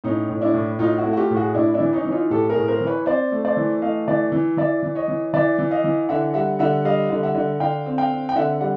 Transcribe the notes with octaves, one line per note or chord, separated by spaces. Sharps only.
A2 C#4 D#4
A2
D4 E4
A2
A2 D#4 F4
E4 F#4
A3
F#4
F4 G4
A2
F#4 G#4
A2 D4 E4
D4 E4
E3
C#4 D#4
E3
D#4 F4
A2 G4 A4
G#4 A#4
A2
A#4 C5
E3
B4 C#5
C4 C5 D5
A3
C5 D5
E3
A3 D#5 F5
E3 D5 E5
E3
E3 D5 E5
E3
C#5 D#5
E3
E3 D5 E5
E3
D#5 F5
E3
D3 E5 F#5
G3 E5 F#5
D3 E5 F#5
G3 D#5 F5
D3
E5 F#5
D3
D3 F5 G5
C4
F5 G5
C4
G5
D3 E5 F#5
G3 F#5